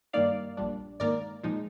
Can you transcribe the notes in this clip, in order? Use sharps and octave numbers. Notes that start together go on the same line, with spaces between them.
G2 D#3 A#3 D#4 D5 F5
A#1 A#2 G3 D4
G#2 D#3 A#3 A#4 D5
A#2 F3 G#3 D#4